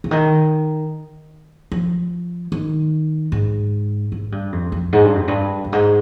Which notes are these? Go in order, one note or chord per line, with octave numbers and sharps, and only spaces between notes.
C#3
D#3
F3
D#3
G#2
G#2
G2
F2
F2
G#2
G2
F2
G2
G2
G#2